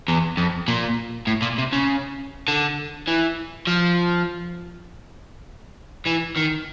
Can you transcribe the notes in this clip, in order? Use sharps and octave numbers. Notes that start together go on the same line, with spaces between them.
E2
F2
A#2
A2
A#2
C3
C#3
D3
E3
F3
E3
D#3